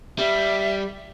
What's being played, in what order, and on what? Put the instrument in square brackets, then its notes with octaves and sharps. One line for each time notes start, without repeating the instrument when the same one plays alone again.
[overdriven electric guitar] G3 [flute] E5